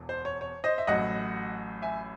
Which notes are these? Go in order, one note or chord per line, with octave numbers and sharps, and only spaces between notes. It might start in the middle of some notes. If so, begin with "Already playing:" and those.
Already playing: E1 E2
C5
C#5
C#5
C5 D#5
E5
A1 A2 F#3 D#5 F#5
E5 G#5